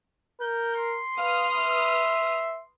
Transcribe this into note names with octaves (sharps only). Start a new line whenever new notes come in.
A#4 G6
C6
B4 F5 D#6 F6
E5